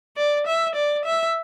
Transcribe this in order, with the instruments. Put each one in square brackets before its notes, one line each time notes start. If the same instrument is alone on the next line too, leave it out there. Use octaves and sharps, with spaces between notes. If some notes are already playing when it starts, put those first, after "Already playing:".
[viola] D5
E5
D5
E5